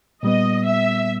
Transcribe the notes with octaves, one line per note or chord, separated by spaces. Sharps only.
A#2 G3 B3 D#5
E5